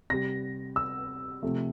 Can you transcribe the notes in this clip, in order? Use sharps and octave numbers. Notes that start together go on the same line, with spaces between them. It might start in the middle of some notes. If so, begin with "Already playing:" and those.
C3 G3 A#6
E6
C3 F3 A3